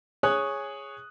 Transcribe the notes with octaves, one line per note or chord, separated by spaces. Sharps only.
G#4 C#5 G#5 C#6 D#6 F#6